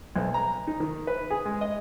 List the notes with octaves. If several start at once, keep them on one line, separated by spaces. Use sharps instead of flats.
B1
A#5
D#4
D#3
B4
G#4
G#3
D#5